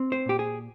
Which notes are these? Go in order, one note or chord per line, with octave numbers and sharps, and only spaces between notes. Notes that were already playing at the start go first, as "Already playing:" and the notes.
Already playing: C4
C5
A#2 G4
G#4